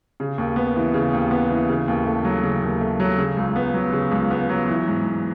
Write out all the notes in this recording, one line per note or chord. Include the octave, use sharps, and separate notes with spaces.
C#3
D#2
B3
E3
C#3
D#2
B3
E3
C#3
D#2
A3
F#3
C#3
D#2
A3
F#3
C#3
C#2
B3
F#3
C#3
C#2
B3
F#3
E3
G#2
G#2